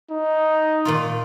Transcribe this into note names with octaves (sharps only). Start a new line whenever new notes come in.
D#4
A#2 D#3 F4